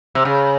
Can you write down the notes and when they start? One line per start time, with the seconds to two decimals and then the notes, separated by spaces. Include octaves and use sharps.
0.15 C3
0.25 C#3